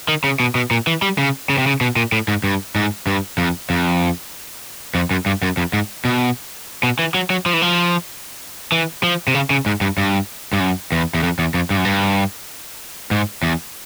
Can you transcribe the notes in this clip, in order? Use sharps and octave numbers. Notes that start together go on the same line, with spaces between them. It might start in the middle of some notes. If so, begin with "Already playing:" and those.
D#3
C#3
B2
B2
A#2
E3
G3
C#3
C#3
C3
C#3
B2
A#2
A2
G#2
G2
G#2
G2
F2
F2
F2
F#2
G2
F#2
F2
G#2
B2
B2
E3
F#3
F#3
F3
E3
F3
E3
F3
C3
C#3
C#3
G#2
G2
G2
G2
F#2
E2
E2
F2
E2
F2
G2
F#2
G2
G#2
E2